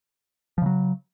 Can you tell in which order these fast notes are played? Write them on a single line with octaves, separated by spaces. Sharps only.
F3 C#3 F#3